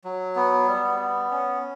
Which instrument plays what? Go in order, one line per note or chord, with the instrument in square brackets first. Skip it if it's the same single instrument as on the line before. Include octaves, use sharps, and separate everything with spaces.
[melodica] F#3
B3
G3
B3
C#4